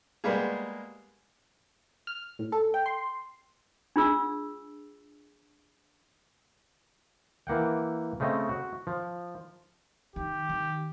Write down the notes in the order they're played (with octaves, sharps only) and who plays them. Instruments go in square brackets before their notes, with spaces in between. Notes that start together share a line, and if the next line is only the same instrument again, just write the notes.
[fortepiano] G3 G#3 A#3 B3 G#4
[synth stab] F6
A2
A4
G5
C6
[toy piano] D4 F4 G#4 E6
[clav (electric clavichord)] E3 A#3 F#5 G5
C#3 A3 C4 D#5
F#4
F3
[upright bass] D#3 [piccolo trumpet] G4
[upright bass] D#3